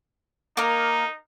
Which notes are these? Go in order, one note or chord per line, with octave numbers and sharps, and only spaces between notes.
A#3 D#4 A#4